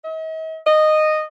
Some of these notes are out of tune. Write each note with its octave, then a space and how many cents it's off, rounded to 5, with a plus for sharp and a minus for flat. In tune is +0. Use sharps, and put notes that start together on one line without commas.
D#5 +45
D#5 -10